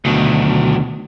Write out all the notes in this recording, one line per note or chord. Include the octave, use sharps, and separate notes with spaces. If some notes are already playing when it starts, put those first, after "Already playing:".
D2 B2 D#3 F#3